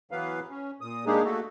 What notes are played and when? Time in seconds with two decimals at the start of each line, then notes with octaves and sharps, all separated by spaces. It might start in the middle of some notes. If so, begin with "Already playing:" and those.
0.11 E3 F#3 B3 B4 F5
0.50 C#4
0.81 A#2 D#6
1.06 G#3 A#3 D4 D#4 G4 G#4
1.24 A3 A#3 F#4 A4